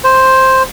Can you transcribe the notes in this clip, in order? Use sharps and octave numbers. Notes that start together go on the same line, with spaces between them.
C5